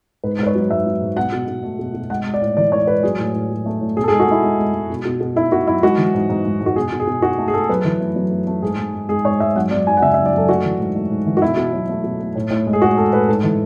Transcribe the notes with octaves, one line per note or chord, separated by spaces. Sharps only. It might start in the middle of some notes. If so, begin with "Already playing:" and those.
G#2 B4
G#2 B4
C#5
F#3
G#2 E5
F#3
G#2
B2 F#5
B2
B2
A3
B2
B2
G#3 F#5
G#3
D5
A2
E3 D5
G#3 C#5
G#3 B4
F#3 G#4
A2
A2
F#3
A3
A2
B2 G#4
A4
G#4
G#3
F#4
G#3 E4
G#3
G#3
G#3
B2
B2
B2
B2 E4
B2 F#4
F#3 E4
G#3 F#4
E3
G#2
G#2
G#2
G#2
F#4
B2 G#4
B2
G#4
B2
B2 F#4
A3
G#4
A3 A4
F#2 B4
E3
A3
F#2
A3
A3
G#2 G#4
G#2
G#3
G#3 G#4
G#2 C#5
G#2 E5
F#2 F#5
F#2 D5
F#3 G#5
F#5
C#3 E5
E5
F#2
D5
F#2 A4
A3 F#4
E3
G#2
A3
G#2
E3
F#4
B2 E4
B2
F#3
A3
B2
A3
A2
A2
G#3
G#4
A2 F#4
G#3 A4
A2 B4
G#2 A4
E3